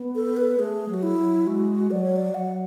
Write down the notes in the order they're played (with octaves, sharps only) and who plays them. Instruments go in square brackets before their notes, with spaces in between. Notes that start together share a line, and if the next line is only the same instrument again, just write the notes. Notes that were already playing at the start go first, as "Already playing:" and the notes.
Already playing: [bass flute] B3
[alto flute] A4
B4
[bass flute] A3 [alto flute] G#4
[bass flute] F#3 [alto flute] F#4
[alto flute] E4
[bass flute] F#3
[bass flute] G#3 [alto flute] F#4
[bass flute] F#3 [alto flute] D5
[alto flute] C#5
D5
[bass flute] F#3 [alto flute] F#5